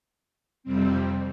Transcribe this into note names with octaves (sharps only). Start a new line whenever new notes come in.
F2 C3 G3 C4